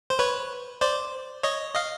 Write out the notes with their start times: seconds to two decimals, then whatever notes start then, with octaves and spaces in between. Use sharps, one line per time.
0.10 C5
0.19 B4 C#5
0.81 C5 D5
1.43 C#5 D#5
1.75 D#5 F5